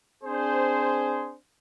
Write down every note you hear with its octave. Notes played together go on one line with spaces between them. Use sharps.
C4 D4 G#4 C5